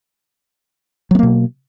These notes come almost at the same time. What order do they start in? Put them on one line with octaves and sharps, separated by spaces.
F#3 B3 A#3 B2